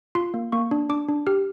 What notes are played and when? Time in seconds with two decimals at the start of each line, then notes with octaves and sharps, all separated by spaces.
0.15 F4 C6
0.34 A#3
0.52 A#3 C#6
0.71 D4
0.89 D4 D6
1.09 D4
1.27 G4 F6